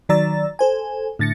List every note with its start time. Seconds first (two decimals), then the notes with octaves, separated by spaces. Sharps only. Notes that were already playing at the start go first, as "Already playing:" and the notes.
0.09 D#3 F#3 D5 A#5 E6 A6
0.59 A4 C5 G#5
1.19 A2 D3 A6 A#6 C#7